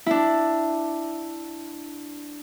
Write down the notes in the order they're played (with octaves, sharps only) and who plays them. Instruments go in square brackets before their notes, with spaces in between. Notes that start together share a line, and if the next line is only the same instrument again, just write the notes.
[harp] D4 E4